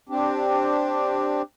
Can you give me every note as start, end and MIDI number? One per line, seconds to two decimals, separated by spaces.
0.09 1.42 60
0.09 1.42 62
0.09 1.42 67